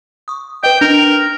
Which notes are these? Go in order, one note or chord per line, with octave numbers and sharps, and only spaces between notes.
C#6 D#6
B4 D#5 G5
D4 A#4